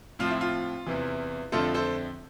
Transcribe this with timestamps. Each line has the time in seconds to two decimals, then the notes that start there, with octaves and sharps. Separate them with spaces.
0.19 A2 F3 C4 F4
0.30 E4
0.41 F4
0.87 E2 C3 E3
1.52 F2 D3 A3 C4 F4 A4
1.74 A4 C5